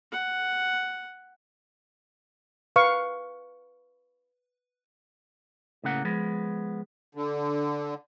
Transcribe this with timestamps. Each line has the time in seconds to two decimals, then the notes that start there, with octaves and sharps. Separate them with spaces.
0.12 F#5
2.76 B4 F5 C#6
5.84 A2 C#3 A#3 F#5
6.05 F3 G#3 B3
7.15 D3